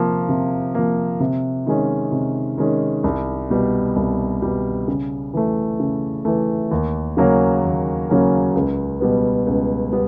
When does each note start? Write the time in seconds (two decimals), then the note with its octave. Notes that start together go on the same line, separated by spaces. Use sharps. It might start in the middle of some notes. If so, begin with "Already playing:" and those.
Already playing: C3 F3 A#3
0.29 C3
0.75 F3 A#3
1.20 C3
1.66 D#3 G#3 C#4
2.12 C3
2.58 D#3 G#3 C#4
3.04 C2
3.50 B2 G3
3.96 C2
4.42 B2 G3
4.88 C#3
5.34 E3 A3
5.80 C#3
6.25 E3 A3
6.71 D#2
7.17 C#3 F#3 A#3 C#4
7.63 D#2
8.10 C#3 F#3 A#3 C#4
8.55 C#2
9.01 B2 G3 B3
9.47 C#2
9.92 G3 B3